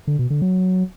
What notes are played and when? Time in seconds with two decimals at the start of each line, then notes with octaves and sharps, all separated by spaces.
0.07 D3
0.19 B2
0.30 D3
0.42 F#3